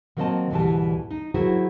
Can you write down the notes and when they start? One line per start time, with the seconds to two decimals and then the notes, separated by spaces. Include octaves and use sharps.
0.17 D#3 F#3 A#3 C4 D#5 A5
0.51 D2 G#2 B2 E3 G3 A5
1.11 D#4
1.34 D#3 F#3 E4 F#4 G#4 C5